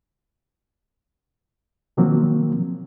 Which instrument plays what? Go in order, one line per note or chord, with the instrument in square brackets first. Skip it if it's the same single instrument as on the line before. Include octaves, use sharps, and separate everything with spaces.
[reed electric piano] B2 D#3 F3 F#3 A#3 C4